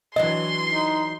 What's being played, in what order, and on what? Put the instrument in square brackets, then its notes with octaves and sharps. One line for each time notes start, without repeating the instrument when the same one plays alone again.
[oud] E3 F#3 D4 [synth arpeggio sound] D#5 [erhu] C6
[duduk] D#4